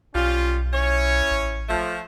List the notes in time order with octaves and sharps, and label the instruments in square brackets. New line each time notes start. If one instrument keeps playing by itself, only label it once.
[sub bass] B1 [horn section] G3 C#4 F4
[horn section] C#4 E4 C#5
[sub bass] A1
[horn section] F3 A3